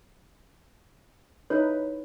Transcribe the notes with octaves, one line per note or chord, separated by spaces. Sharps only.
D#4 E4 B4 C#5